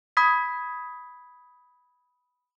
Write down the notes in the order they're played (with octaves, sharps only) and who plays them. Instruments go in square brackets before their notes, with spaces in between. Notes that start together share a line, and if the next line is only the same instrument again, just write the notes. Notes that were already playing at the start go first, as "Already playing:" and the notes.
[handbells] B5 D#6 G#6 B6